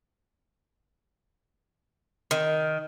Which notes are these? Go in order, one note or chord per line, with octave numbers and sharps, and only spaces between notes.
D#3